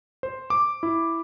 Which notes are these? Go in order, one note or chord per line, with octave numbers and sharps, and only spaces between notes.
C5
D6
E4